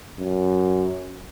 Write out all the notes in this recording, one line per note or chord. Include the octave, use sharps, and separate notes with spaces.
F#2